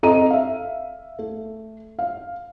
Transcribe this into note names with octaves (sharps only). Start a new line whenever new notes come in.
C4 A4 D#5 A#5 D#7
E5 F5
A3
F5